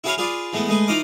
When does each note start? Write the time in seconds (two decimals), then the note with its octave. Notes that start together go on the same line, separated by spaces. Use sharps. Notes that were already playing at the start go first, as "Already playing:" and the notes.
0.04 E4 F#4 G#4 B4 C#5 F5
0.18 F4 G#4 B4 D5
0.53 E3 G#3 A3 B3
0.69 G#3 A3 G#4 B4
0.88 E3 D#4 F4 D#5 F5 D6